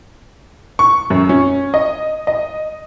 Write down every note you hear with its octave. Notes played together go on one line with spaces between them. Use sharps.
C#6
F#2
C#4
D#5
D#5